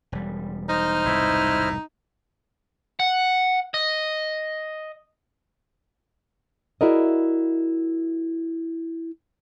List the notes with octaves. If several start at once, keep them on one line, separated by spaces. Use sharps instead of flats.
E1 G3
D#4 C5 D#5 F6
E1 C2 G#2 E4
F#5
D#5
E4 F#4 G#4 A#4 D5 D#5